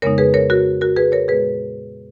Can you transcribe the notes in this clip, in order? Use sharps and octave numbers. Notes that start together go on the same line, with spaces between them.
F2 C#3 G#3 B3 D#4 A#4 C#5
G#4 B4
A#4 C#5
F#4 A#4
F#4 A#4
G#4 B4
A#4 C#5
A#2 G#3 B3 G#4 B4